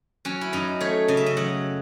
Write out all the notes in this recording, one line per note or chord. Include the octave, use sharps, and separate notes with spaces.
F#3 C#4
E4
F#2 D#4
A3 C#5
C#3 D#5
E5
D#5
F#3 F#5